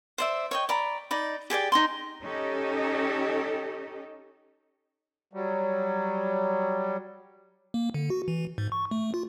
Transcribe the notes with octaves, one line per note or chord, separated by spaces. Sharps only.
C5 D5 E5
C#5 D#5 G5
D5 A#5 B5
D#4 D5 B5
G4 G#4 D5 G5
D#4 A4 C6
C#4 D#4 G4 A4
F#3 G3
A#3
D3
F#4
E3
G#2
C#6
A3
F4